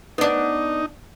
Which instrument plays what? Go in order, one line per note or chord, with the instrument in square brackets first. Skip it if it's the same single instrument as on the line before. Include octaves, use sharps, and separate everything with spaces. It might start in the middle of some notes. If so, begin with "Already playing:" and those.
[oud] B3 D4 [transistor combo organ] D#4